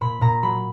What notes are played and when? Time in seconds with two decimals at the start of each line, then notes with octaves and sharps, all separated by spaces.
0.01 A#2 B5
0.21 A#2 A#5
0.43 F#3 B5